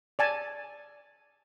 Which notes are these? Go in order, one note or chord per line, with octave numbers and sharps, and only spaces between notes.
D5 G#5 A5